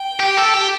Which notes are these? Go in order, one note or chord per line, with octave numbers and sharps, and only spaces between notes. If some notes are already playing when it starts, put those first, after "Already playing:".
Already playing: G5
G4
A4
G4